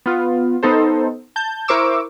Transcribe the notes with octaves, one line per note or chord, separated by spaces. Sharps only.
B3 F4
B3 D#4 A4 C5
A5 G6
E4 A#4 C5 C#6 D6 E6